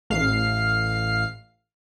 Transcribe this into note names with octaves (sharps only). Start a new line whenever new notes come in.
A1 F5 C7